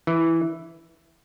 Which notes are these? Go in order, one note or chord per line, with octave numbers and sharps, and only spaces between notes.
E3